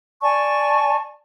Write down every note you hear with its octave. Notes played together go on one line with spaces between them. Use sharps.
D5 G#5 A5 C#6